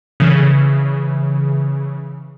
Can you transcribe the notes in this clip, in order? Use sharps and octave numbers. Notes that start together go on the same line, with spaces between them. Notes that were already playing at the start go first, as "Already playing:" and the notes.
C#3 E3